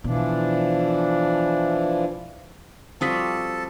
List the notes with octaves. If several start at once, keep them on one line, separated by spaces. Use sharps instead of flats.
B2 E3 F3 D4
F3 G3 C4 F#4 A4 A5 D#6 B6